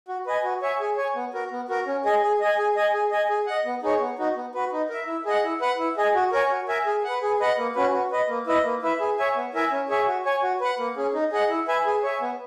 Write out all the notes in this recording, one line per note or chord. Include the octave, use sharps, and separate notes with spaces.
F#4
B4 D#5 G#5
F#4
C#5 E5 G#5
G#4
C#5 G#5
B3
F#4 A#4
B3
F#4 A#4
C#4
G#4 D#5 G#5
G#4
D#5 G#5
G#4
D#5 G#5
G#4
D#5 G#5
G#4
D#5 F#5
B3
D#4 G#4 C#5
B3
D#4 F#4
B3
F#4 B4
D#4
A#4 E5
E4
G#4 D#5 F#5
E4
B4 F#5
E4
G#4 D#5 G#5
F#4
A#4 C#5 G#5
F#4
A#4 E5 G#5
G#4
B4 F#5
G#4
B4 D#5 F#5
A#3
C#4 F#4 B4
F#4
B4 D#5
A#3
E4 B4 D#5
A#3
E4 B4 E5
G#4
C#5 E5 G#5
B3
E4 A#4 E5 G#5
C#4
G#4 C#5 E5 G#5
F#4
C#5 G#5
F#4
B4 F#5
A#3
C#4 G#4
D#4
G#4 D#5 F#5
E4
B4 E5 G#5
G#4
C#5 E5 G#5
B3